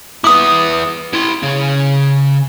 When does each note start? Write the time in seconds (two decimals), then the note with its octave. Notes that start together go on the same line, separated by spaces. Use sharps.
0.24 B3 E4 D6 D#6
1.13 E4 C6
1.43 C#3 C#4